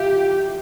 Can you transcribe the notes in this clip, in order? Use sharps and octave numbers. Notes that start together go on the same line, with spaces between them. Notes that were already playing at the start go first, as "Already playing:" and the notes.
Already playing: G4 E5 F5